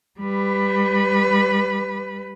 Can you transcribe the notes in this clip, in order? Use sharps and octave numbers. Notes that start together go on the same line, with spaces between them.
G3 B4